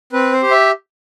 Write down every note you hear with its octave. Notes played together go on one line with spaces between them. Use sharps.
C4 B4
C5
G4
E5